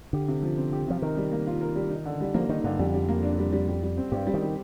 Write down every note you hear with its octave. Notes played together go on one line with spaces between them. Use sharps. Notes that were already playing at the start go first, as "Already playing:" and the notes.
D3 G4
C3
F3
C4
G4
C3 F3
D#3 A#4
G3
A#3
F4
A#4
G3
D#4
D3
G3
F3 A#3
D#3 D#4
G2 D3
F2 G3
G3
A#3
D4
G3
G3
G3
G3
C4
G2 G4
G3
D#3
G3